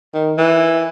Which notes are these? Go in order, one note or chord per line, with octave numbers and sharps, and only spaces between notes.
D#3
E3